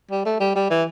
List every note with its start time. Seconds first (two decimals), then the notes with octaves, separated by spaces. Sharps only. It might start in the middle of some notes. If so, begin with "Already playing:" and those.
0.11 G3
0.25 A3
0.40 G3
0.55 G3
0.70 E3